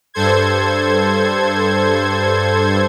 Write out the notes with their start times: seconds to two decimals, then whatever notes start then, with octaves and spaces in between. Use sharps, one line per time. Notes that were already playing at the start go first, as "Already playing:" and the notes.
0.14 G2 A4 C5 G#6